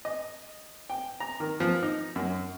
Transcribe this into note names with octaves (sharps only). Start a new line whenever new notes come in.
D#5
G5
A#5
D#3
F3
D#4
F#2